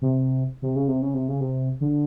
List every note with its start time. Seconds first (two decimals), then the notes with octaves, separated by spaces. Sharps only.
0.02 C3
0.62 C3
0.76 C#3
0.88 C3
1.02 C#3
1.14 C3
1.28 C#3
1.41 C3
1.81 D3